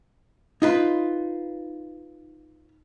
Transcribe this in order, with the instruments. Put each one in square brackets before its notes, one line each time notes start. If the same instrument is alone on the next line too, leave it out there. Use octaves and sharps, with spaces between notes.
[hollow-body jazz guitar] D#4 F4 B4